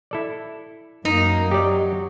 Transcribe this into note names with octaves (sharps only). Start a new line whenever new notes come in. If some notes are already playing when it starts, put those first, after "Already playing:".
E4 A4 D5
F#2 A#3 D#4
F#3 G4 D5